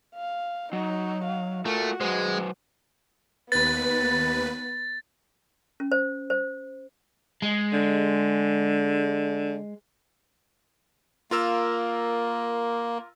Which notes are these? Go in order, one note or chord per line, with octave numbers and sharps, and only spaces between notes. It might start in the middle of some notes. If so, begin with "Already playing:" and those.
F5
F#3 D#4
F5
A3 F4 F#4 A#4
F#3 G#3 B4 C5
D#2 B3 B4 A6
C#4
C5
C5
G#3
D3
A#3 F4 A#4 E6